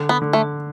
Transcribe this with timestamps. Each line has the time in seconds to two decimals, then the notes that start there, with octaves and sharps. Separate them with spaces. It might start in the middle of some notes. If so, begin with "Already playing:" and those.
Already playing: D3
0.09 B3
0.22 D3
0.33 A3